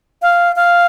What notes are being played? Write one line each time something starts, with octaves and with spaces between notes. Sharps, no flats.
F5
F5